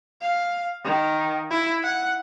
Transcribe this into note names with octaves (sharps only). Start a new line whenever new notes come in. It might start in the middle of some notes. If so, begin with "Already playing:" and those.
F5
D#3
E4
F#5